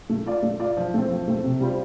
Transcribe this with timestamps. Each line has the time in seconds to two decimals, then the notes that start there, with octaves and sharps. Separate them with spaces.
0.10 A3
0.26 F4 D5
0.43 A3
0.60 F4 D5
0.77 F3
0.94 A3 C4
1.11 F3
1.28 A3 C4
1.43 C3
1.60 G3 F4 C5